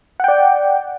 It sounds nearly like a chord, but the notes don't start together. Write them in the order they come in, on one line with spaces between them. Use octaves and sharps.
F#5 G5 D5